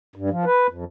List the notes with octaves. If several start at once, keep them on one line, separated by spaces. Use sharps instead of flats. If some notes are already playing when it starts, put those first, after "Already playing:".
G2
F3
B4
F2